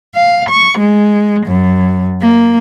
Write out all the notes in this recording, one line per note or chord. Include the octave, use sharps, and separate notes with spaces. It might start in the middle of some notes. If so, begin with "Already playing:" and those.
F5
C#6
G#3
F#2
A#3